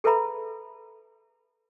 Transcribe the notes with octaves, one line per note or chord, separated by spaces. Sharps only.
G#4 A4 B4 E5 A#5 B5